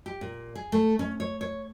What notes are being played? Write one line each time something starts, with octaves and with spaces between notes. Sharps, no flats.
G4
A#2
G#4
A3
C#4
C#5
C#5